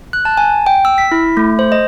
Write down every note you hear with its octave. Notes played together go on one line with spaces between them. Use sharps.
F#6
A5
G#5
G5
E6
B6
E4
A3
C5
D#5